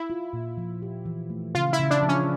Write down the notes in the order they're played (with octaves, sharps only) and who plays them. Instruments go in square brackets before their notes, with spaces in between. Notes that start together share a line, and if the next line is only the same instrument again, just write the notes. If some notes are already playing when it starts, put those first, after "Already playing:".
Already playing: [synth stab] E4
[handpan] F4
A#2
F3
G4
E3
A3
[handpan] C#3 [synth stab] F4
[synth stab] E4
[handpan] C#3
[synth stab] D4
[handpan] F3
[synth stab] C#4